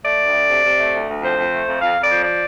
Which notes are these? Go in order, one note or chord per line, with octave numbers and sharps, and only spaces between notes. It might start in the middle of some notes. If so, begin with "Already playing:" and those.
A3 D5
D2
A3
C3
C3
A3
D2
D2
F2 C5
F2
A3
F2
F2 F5
F2 D5
F3
D5